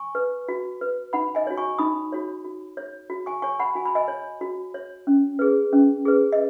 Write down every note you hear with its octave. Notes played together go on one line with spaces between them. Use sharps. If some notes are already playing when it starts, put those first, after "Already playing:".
Already playing: G#5 C#6
B4
F#4
B4
D#4 F#5 B5
D#5 G#5
F#4 C#5
G#5 C#6
D#4 B5 D#6
F#4 C#5
F#4
C#5
F#4
G#5 C#6
C#5 G#5 C#6
F#5 B5
F#4 G#5
B5
D#5 G#5
C#5
F#4
C#5
C#4
G#4 B4
C#4
G#4 B4
D#5